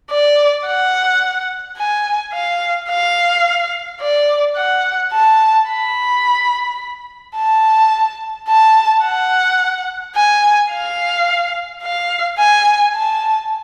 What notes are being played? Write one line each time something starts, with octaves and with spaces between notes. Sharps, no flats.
D5
F#5
G#5
F5
F5
D5
F#5
A5
B5
A5
A5
F#5
G#5
F5
F5
G#5
A5